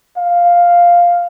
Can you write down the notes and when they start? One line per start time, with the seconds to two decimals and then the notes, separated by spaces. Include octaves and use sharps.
0.17 F5